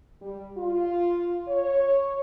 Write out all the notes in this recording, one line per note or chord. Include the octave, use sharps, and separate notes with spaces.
G3
F4
C#5